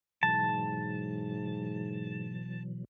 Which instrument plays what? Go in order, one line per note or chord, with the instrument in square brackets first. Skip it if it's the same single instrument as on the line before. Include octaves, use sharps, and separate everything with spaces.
[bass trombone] G#2 [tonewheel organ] B2 E3 F#3 [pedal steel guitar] A5